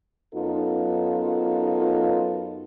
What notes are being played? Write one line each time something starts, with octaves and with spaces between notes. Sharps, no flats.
F#2 B3 D#4 F4 A4